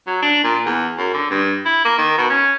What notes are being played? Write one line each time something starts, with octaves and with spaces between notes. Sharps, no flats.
F#3
D4
A#2
E2
F#2
D3
G2
E4
A#3
D#3
B2
C#4